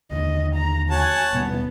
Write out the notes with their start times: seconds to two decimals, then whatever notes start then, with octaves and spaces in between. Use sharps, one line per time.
0.11 D#2 D3 D#5
0.56 A#5
0.90 F#4 C#5 F#5 G#5 A5
1.32 D#1 B2 G3 B3